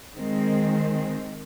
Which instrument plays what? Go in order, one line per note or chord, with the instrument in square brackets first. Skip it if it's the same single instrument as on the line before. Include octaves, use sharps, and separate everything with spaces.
[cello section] D#3 G#3 C4